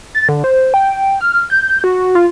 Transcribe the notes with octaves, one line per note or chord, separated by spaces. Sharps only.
A6
D3
C5
G5
F6
G6
F#4
F4